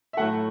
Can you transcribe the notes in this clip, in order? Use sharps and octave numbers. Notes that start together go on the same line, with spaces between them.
E5
A2 F#3 A3 F#5